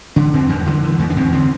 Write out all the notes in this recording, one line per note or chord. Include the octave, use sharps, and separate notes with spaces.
D3 D4
E2 C4
E2 G3
D3 E3
D3 E3
E2 A3
D4
E2 C4
D3 C4